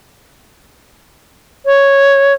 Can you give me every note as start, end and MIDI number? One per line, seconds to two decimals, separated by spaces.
1.66 2.33 73